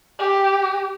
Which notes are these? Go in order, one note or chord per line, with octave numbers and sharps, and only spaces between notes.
G4